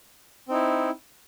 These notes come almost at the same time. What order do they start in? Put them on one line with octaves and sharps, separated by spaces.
C4 D#4 E4